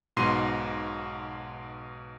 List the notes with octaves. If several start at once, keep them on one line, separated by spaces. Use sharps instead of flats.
B1 G#2 B2 C6 C7 D#7